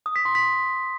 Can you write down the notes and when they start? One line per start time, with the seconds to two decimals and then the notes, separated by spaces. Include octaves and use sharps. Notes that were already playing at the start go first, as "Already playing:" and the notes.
0.06 D#6
0.16 B6
0.25 C6
0.35 B6